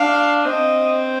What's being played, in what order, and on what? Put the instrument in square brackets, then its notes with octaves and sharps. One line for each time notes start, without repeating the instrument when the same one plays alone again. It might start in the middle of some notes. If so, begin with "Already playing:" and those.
Already playing: [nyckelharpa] D4 [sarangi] F5
[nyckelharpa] C4 [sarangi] D#5